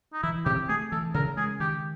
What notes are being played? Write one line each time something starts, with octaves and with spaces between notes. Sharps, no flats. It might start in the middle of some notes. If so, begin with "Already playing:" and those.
D#4
E3 E4
C3 G4
A3 G#4
E3 A4
C#3 A#4
G#3 G#4
D#3 G4